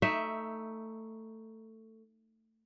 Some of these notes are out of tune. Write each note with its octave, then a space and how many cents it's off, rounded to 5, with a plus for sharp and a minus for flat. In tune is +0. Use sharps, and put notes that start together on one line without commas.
A3 +15 D#4 +5 E5 +0